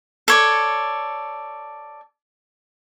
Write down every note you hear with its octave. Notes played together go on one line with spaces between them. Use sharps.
A4 C#5 D5